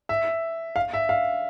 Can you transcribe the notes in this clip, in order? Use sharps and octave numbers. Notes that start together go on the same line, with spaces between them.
E5
F5
E5
F5